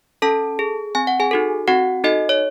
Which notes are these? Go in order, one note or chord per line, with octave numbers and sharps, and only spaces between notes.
C#4 A4 A5
G#4
C4 G#5
F#5
G#4 G#5
D#4 F#4 A4
C4 F#4 F#5
D#4 F#4 A4 D#5
C#5